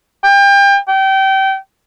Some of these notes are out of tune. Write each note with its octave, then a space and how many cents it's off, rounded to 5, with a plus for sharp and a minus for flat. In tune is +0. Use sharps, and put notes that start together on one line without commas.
G5 +30
G5 -25